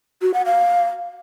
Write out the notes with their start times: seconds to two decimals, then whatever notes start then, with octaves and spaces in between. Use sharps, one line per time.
0.22 F#4
0.34 F#5
0.46 F5